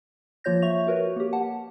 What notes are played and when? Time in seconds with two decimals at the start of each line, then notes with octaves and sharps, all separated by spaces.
0.44 F3 A#3 F4 C#5 G6 A#6
0.62 E5 C#6 F7
0.87 F#4 A#4 B4 C#5
1.16 A#3 G4
1.33 F#5 A5